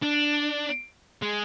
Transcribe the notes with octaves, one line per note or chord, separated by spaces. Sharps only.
D4
G#3